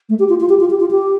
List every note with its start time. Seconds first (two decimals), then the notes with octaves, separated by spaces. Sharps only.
0.09 A3
0.19 G4
0.29 F4
0.40 F4
0.49 G4
0.60 F4
0.70 G4
0.80 F4
0.91 G4